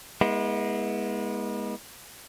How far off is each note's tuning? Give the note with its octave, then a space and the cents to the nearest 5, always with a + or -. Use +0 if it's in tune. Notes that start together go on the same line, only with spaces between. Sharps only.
G#3 -5 B3 -35 E4 -35